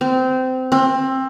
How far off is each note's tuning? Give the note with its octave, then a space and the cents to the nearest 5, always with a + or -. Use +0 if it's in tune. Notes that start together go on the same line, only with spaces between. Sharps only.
C4 -20
C4 +20